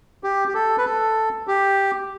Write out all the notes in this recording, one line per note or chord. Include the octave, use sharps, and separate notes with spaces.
G4
G4
A4
B4
A4
G4